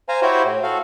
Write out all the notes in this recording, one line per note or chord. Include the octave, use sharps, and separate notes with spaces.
C5 F5 G#5 A#5
E4 F#4 G4 C5 C#5 G5
A2
F#4 A4 F5